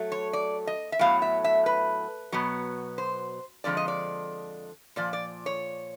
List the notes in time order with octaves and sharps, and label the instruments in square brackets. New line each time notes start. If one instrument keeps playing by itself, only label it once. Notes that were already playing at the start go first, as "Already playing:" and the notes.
Already playing: [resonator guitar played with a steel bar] F#3 A3
C#5
D5
D#5
E5
A2 F#3 B3 F5
E5
E5
B4
B2 F#3 B3
C5
F2 D3 F3 G#3 D5
D#5
D5
A#2 F3 D5
D5
C#5